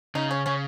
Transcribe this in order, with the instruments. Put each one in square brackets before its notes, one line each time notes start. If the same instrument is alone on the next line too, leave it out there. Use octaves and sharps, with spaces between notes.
[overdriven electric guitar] C#3 [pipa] D#4
[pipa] C#4
[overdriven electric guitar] C#3 [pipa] C#4